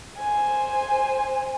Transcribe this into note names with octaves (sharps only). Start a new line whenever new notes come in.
C5 G#5